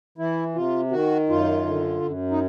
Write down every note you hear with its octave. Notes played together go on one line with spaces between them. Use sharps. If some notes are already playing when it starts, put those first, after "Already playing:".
E3 E4
C3 F4
D#3 F#4
F#2 F4
D3
F#2
D#4